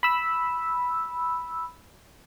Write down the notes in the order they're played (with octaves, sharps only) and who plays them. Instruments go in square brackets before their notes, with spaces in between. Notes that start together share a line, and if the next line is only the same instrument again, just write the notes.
[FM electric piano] B5 E6